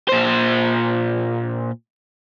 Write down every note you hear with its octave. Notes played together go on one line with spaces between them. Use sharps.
A#2 C5